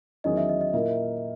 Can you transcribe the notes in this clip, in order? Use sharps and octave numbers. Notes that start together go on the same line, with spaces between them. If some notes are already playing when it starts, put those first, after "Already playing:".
E2 D#3 F#3 C#4 G#4 D#5
E5
D#5
D#5
A#2 A#3 E4 A#4 E5